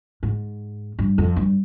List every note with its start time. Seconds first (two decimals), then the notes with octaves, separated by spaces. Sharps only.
0.23 G#2
0.99 G2
1.18 F2
1.36 G2